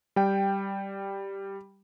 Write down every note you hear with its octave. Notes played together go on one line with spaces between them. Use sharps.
G3 G5